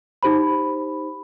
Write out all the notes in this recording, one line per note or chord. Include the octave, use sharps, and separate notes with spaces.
D#4 G4 C5 B5